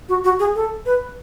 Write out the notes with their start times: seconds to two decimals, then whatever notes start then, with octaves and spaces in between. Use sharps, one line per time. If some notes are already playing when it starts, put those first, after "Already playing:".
0.09 F#4
0.24 F#4
0.39 G#4
0.55 A4
0.86 B4